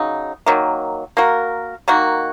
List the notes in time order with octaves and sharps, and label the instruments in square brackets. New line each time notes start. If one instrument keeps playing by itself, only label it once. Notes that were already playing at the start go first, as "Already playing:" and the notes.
Already playing: [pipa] C#3 F#3 D#4
D#3 F#3 A#3
A#3 F#4 A#4
D#3 A#3 F#4